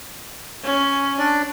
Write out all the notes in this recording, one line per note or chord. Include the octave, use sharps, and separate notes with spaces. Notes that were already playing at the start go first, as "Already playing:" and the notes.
C#4
D4 D5